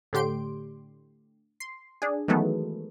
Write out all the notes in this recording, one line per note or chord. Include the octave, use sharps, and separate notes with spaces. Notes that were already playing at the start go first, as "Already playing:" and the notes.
A2 D3 G4 C6 D7
C6
D4 G#4
D#3 E3 F#3 G#3 A3 B3